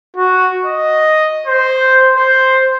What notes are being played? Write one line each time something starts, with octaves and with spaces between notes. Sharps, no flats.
F#4
D#5
C5
C5